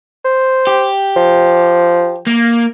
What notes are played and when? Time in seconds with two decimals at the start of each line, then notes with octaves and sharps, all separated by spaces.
0.25 C5
0.67 G4
1.16 F3
2.27 A#3